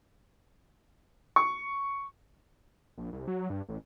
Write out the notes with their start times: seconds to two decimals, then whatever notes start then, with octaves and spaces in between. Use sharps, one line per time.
1.36 C#6
2.98 A#1
3.13 C2
3.28 F#3
3.50 G2
3.69 A1